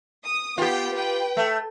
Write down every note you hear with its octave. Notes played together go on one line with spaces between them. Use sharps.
D#6
B3 F4 G4 G5
B4 G5
A3